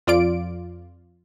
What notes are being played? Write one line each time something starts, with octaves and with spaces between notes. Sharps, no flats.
F2 F4 D5 D7